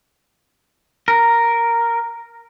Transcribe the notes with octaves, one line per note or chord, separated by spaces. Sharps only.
A#4